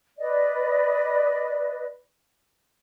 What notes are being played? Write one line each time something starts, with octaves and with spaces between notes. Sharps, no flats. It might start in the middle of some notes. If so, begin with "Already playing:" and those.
B4 D5 D#5